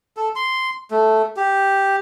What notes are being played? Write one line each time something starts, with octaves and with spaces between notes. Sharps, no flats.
A4
C6
A3
G4